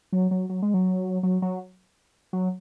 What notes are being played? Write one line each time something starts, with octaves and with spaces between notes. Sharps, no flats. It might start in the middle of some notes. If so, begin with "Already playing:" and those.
F#3
F#3
F#3
G#3
F#3
F#3
F#3
F#3